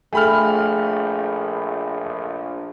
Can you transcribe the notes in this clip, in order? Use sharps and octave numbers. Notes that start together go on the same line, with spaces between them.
A#1 A3 G#4 G5 G#5 B5 F6